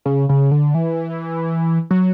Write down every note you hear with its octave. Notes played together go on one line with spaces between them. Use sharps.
C#3
C#3
D3
E3
F#3